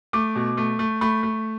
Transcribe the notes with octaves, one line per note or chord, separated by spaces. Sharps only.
A3 D6
B2
A3
A3
A3 B5
A3